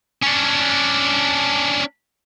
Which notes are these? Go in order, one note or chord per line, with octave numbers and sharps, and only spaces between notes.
C#4 D4